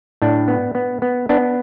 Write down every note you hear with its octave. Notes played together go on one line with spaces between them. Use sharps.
A2 D4
B3
B3
B3
B3 D4